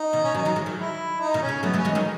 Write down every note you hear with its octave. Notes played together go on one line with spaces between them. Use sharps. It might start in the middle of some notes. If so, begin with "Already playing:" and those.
Already playing: D#4
B2 D#3
C#4
D#3 F#3 D#4
D#3 F#3
E3 G#3
D#3 F#3
E4
D#4
B2 D#3
C#4
C#3
F#3 A3 B3
F#3 A3
C#4
E3 G#3
D#3 F#3 D#4